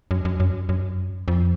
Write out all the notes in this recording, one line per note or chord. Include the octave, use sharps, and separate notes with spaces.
F#2
F#2
F#2
F#2
F2